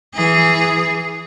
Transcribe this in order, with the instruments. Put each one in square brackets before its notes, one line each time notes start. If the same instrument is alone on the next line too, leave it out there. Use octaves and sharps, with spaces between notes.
[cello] E3 G#4